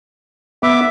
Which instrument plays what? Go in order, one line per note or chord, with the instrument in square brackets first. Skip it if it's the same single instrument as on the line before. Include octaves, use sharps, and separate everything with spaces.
[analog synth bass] B3 [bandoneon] E5 D6